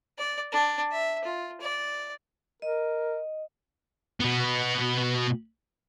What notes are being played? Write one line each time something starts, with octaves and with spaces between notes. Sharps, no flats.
D5
D4
E5
F4
D5
A#4 D#5
B2 B3